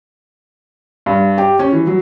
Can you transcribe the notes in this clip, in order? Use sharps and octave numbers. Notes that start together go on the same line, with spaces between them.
G2
G4
C#4
E3
F#3